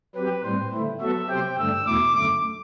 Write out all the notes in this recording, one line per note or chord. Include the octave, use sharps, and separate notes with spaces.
F#3 C4 G4 B4
A2 G3 C4 C5
D3 A3 E4
F#3 B3 F#4 A4 E5
C3 F#3 C4 G4 C5 G5
G2 D3 A3 D4 E6
E2 B2 A3 E4 D6
F#2 D3 A3 D6